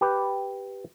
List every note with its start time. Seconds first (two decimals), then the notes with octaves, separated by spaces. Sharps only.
0.01 G4 B4